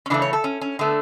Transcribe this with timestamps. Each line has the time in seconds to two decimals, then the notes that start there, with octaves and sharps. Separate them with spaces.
0.06 C#4
0.10 C#3 E3 A3 D4
0.22 C#5
0.33 A4
0.44 C#4
0.61 C#4
0.79 D3 A3 B3